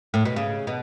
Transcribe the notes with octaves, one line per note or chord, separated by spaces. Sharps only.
A2
B2
C#3
B2